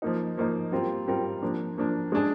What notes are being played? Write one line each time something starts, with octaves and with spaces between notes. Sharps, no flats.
F3 A#3 D#4
F3 A#3 D#4
G3 C4 F4 A#4
G3 C4 F4 A#4
F3 A#3 D4
F3 A#3 D4
G#3 D4 G#4